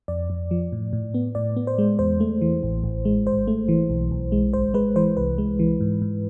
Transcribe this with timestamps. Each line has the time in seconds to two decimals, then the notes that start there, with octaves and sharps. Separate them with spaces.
0.08 F2 D5
0.30 F2
0.51 F3
0.72 A2
0.93 A2
1.14 B3
1.35 A2 D5
1.57 B3
1.67 C5
1.78 G#3
1.99 E2 C5
2.20 A3
2.41 E3
2.63 A1
2.84 A1
3.05 G#3
3.26 G#1 C5
3.47 A3
3.69 E3
3.90 B1
4.11 B1
4.32 G#3
4.53 G#1 C5
4.74 G#3 B4
4.96 E3 C5
5.17 C2 B4
5.38 G#3
5.59 E3
5.81 G#2
6.02 G#2